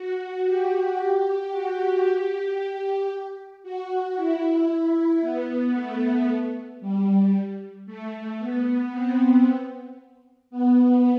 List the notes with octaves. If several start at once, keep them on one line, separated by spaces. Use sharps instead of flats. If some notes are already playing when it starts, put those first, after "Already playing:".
Already playing: F#4
G4
G4
F#4
G4
G4
F#4
E4
B3
A3
G3
A3
B3
C4
B3